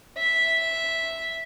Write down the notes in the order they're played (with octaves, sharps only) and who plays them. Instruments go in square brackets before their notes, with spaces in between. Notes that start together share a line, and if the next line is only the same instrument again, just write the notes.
[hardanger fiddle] E5